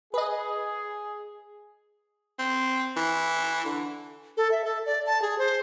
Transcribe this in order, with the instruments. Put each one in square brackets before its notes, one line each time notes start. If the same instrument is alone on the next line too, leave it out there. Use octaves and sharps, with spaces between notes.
[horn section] G#4 [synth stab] B4 D#5
[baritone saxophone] C4
E3
D3
[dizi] A4
E5
A4
D5
A5
G#4
C5